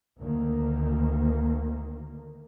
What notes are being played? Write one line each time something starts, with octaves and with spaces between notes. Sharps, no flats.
D2 D#3 A#3